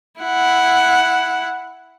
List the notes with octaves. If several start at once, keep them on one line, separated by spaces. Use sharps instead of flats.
E4 F#5